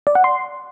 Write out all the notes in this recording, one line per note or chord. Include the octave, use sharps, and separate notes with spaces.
D5
F#5
C6